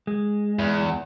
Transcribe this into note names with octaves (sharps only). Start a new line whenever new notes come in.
G#3
E2